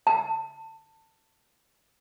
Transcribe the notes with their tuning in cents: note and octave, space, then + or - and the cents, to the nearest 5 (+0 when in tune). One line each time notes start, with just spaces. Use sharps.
A5 +20